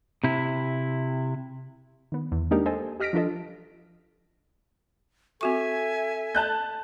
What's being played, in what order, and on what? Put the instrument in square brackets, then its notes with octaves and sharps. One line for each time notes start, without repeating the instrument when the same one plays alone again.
[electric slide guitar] C3 E4
[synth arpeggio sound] D#3 B3
E2
G#3 A#3 D4 D#4 G4 A#4
A4 C5 D#5 G#5
G4 D#5 F6 A#6 B6 D7
F3 D4 F4 A4 D#5
[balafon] C4 F#4 C#6 [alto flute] A4 [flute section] E5 G#5
[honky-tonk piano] A5 F#6 G6